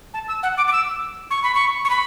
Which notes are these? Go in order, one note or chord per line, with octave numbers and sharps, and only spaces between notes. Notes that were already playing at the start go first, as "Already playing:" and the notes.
A5
E6
F#5
D6
D6
E6
C#6
B5
C#6
C#6
B5